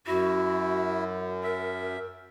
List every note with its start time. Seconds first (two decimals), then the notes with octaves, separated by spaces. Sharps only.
0.07 F#2 E4 F#4
1.44 A#4 E5